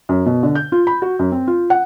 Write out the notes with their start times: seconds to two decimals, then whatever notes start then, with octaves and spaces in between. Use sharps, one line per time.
0.09 F#2
0.26 B2
0.43 D3
0.55 G6
0.72 F4
0.87 B5
1.02 F#4
1.19 F#2
1.32 C4
1.47 F4
1.70 F#5